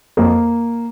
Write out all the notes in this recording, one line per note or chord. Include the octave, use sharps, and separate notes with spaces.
F2 A#3